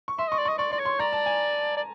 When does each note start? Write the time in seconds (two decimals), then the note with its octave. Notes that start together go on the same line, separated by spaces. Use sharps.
0.08 C#6
0.19 E5 C6
0.28 D#5 C#6
0.39 D5
0.45 D#5 C#6
0.58 D5 C#6
0.72 D5 C6
0.79 C#5
0.85 C6
0.99 D5 A#5
1.13 A5
1.26 G#5
1.77 D5